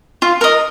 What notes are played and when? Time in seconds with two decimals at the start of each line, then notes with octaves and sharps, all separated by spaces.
0.22 F4
0.41 A#4 D#5